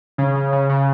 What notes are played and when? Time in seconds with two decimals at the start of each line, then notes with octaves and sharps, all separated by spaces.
0.18 C#3
0.35 C#3
0.53 C#3
0.70 C#3